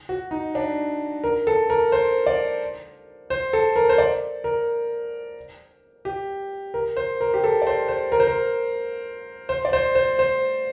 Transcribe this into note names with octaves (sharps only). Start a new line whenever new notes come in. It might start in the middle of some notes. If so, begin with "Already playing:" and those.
F#4
D#4
D4
A#4
A4
A#4
C5
D5
C5
A4
A#4
C5
D5
A#4
G4
A#4
C5
A#4
G4
A4
D5
C5
C5
A#4
C5
A#4
C5
D5
C5
C5
C5